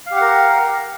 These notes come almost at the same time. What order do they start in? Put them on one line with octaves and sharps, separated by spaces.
F5 G4 F#5 A#4